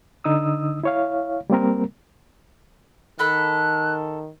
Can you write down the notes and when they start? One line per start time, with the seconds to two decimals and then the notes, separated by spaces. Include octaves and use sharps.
0.24 D3 D#4 D#6 E6
0.83 E4 C#5 F5
1.50 G3 A#3 C4 A#4
3.19 D#3 A4 B5 F#6